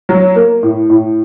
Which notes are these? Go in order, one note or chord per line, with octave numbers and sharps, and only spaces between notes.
F#3
A#3
A2
A2